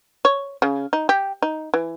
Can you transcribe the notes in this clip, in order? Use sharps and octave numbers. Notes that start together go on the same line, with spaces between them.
C#5
C#3
D#4
G4
D#4
E3